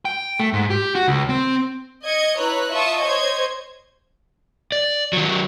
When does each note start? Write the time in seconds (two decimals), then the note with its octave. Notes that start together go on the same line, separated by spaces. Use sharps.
0.05 G5
0.40 A3
0.53 G#2
0.70 G4
0.95 F#4
1.08 C#2
1.29 C4
2.03 D#5 G#6 C#7
2.38 E4 B4 C#5 A#5 F#6
2.73 F4 E5 A5 C#6 D#6
3.02 C5 C#5 D#5 G#6
4.72 D5
5.13 D#3 F#3